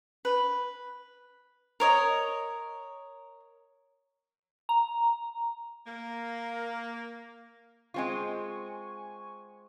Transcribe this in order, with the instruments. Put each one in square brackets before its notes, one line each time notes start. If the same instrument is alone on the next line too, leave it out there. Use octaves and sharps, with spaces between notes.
[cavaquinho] B4
A#4 C#5 D#5
[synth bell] A#5
[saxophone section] A#3
[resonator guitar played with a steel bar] G#3 C4 F4 [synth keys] G#5 C#6